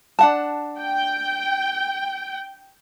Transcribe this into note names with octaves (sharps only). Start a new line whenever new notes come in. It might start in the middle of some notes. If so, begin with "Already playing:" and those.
D4 F#5 A5
G5